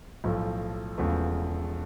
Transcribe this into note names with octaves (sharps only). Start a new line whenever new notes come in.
B1 A2 F3 A3
E1 E2 C#3 F3 A3